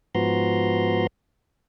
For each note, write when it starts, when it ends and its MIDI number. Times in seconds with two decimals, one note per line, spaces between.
0.15 1.07 44
0.15 1.07 53
0.15 1.07 59
0.15 1.07 66
0.15 1.07 82
0.15 1.07 84